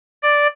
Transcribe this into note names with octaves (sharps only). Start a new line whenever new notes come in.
D5